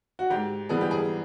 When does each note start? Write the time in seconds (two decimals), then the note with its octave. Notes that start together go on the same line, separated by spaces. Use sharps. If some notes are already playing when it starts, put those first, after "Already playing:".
0.19 F#4
0.30 G#2 G4
0.69 E3 G3 B3 G#4
0.81 G4
0.91 G#4